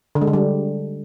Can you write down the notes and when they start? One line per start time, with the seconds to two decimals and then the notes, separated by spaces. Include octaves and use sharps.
0.15 D3
0.21 G#3
0.27 D3
0.33 G3